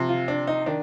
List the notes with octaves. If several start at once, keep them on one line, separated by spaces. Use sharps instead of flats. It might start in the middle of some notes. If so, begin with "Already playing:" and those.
Already playing: C3 F3
F4
D4
D#4
D#3 D4